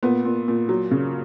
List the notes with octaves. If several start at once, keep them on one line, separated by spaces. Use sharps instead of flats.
A#2 B3
A#2
A#2
F#3
C#3